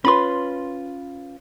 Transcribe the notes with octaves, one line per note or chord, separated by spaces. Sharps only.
C#4 F4 B4 B5 C6